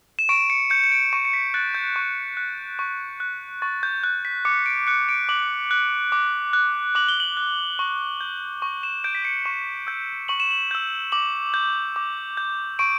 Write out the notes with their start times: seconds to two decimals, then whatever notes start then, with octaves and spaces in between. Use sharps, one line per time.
0.19 E7
0.29 C#6 D7
0.50 C#7
0.70 G6 C#7
0.84 C#7
0.92 D7
1.13 C#6 C#7
1.25 C#7
1.33 B6
1.54 F#6 A6
1.75 G6
1.96 C#6
2.37 F#6
2.79 C#6
3.20 F#6
3.62 C#6 A6
3.83 G6
4.03 F#6 G6
4.25 B6
4.45 D6 C#7
4.66 D7
4.87 F#6 C#7
5.09 D7
5.29 D6 F#7
5.71 F#6
6.12 D6
6.53 F#6
6.95 D6 F#7
7.08 G7
7.20 F#7
7.37 F#6
7.79 C#6
8.21 G6
8.62 C#6
8.83 E7
9.04 G6 D7
9.15 B6
9.25 C#7
9.45 C#6 E7
9.87 E6 G6
10.28 C#6 F#7
10.40 E7
10.51 F#7
10.71 E6 G6
11.12 D6 F#7
11.54 G6
11.96 D6
12.37 G6
12.79 C#6 D7